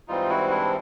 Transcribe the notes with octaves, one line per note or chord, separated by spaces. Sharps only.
G#2 E3 G3 C4 D#4 F4
E4 F#4
D4 E4